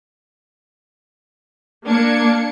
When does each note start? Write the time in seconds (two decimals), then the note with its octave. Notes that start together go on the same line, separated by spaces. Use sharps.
1.88 A#3 D4 G#6 C#7